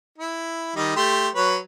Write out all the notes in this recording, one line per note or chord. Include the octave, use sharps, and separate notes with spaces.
E4
D#3 G3 D#4
A3 G4 C6
F#3 B4 C#5